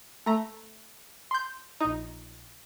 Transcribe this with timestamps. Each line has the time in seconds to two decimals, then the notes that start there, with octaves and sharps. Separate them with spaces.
0.26 A3 A#5
1.31 C6 G6
1.80 A#1 D#4